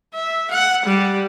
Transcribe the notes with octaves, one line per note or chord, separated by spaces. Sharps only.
E5
F#5
G3